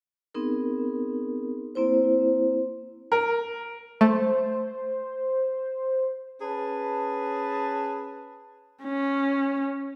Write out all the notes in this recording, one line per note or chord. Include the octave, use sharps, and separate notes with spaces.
B3 C4 D#4 G#4 A#4
A#3 C4 E4 C5
A#4
A3 C5
C#4 G#4 B4 A5
C#4